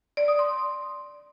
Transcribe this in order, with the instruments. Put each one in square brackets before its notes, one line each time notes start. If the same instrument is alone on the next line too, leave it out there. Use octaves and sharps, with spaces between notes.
[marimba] D5
D#6
C6